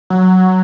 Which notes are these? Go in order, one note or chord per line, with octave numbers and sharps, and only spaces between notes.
F#3